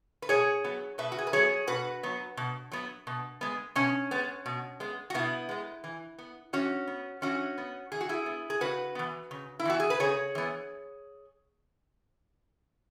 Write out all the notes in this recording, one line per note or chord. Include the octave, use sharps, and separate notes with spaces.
B4
B2 G#4 C#5
F#3 B3
B2 B4 E5
F#4
G#4
B4
F#3 B3 G#4 C#5
B2 F#4 B4
F#3 B3
B2
F#3 B3
B2
G#3 B3
B2 C#4
G#3 B3
B2
G#3 B3
F#4
B2 B3 E4
G#3 B3
E3
B3
E3 C#4 F#4
B3
E3 C#4 F#4
B3
E3 G#4
F#4
E4 G#4
B3
G#4
C#3 F#4 B4
E3 B3
C#3
E4
E3 B3 F#4
G#4
B4
C#3 G#4 C#5
E3 B3